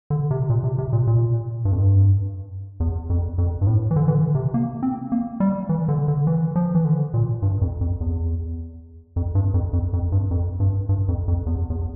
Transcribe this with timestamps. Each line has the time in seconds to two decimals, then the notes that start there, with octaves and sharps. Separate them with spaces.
0.10 D3
0.31 C3
0.49 A#2
0.64 C3
0.78 C3
0.93 A#2
1.07 A#2
1.65 G2
1.72 F2
1.80 G2
2.80 E2
3.10 F2
3.38 F2
3.61 G2
3.67 A2
3.91 E3
3.96 D3
4.08 E3
4.15 D3
4.35 C3
4.54 A#3
4.83 C4
5.12 A#3
5.40 G3
5.69 E3
5.88 D3
6.08 D3
6.27 E3
6.56 F3
6.75 E3
6.85 D3
7.14 A#2
7.42 G2
7.62 F2
7.81 F2
8.00 E2
9.16 F2
9.35 G2
9.54 F2
9.73 F2
9.93 F2
10.12 G2
10.31 F2
10.60 G2
10.89 G2
11.08 F2
11.28 F2
11.46 E2
11.70 E2